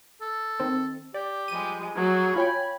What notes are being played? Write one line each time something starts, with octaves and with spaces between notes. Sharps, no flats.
A4
D#3 C4
G4 D5
F3 G3 G#3 D#7
F#3 G#4
F4 C#5 G5 G#5 B5